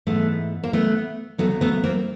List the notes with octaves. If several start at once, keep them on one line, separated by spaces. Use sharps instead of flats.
G#2 E3 A3 B3
A#3
A3 B3
D2 C#3 F#3 A3 B3
A3 B3
A#3 C4